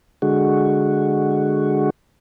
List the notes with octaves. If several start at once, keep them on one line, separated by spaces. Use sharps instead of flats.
D3 G#3 F#4